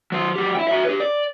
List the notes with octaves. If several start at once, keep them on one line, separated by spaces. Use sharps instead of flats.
F#3 C5
F#3 G4
E4 G5
F#4 E5
G4 B4
D5